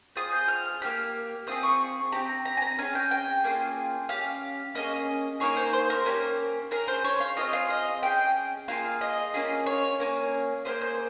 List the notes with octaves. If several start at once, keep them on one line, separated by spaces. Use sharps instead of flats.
C4 F4 G#4 D#6
G6
F6
A#3 D#4 G4 F6
C4 F4 G#4 D#6
C#6
C4 G4 A#5
A#5
G#5
A#5
C#4 F4 G#4 G#5
G5
G5
A#3 C#4 F4 G#4
C#4 G4 F5
A#3 C#4 G#4 D#5
A#3 D#4 G#4 C#5
C5
C5
A#4
A#3 C#4 G4
C#4 G#4 A#4
C5
C#5
F5
C4 F4 G#4 D#5
F5
D#5
C#4 F4 G#4 G5
A#3 F4 G#4 F5
D#5
A#3 C#4 F4 G#4
C#5
A#3 C#4 G#4
A#3 D#4 G#4 C5
C5